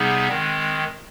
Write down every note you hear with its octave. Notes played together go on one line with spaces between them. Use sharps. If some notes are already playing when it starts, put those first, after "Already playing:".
Already playing: C3 G3 B3 D#4 G#4
D#3 G#3 C4